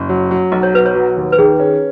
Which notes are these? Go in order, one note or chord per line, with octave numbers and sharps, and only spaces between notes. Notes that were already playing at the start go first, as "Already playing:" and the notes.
Already playing: F#1
F#3
F#3
B1 D#5
C#5
B2 B4
C#5
F#3
D#2
B4
D#3 G#4
C#4